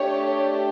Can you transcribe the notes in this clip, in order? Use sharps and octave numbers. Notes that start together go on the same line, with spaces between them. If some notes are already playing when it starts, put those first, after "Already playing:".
Already playing: A3 D4 G4 C#5